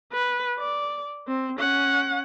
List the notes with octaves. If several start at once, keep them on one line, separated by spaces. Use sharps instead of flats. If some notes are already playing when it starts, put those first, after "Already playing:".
B4
D5
C4
C#4 F#5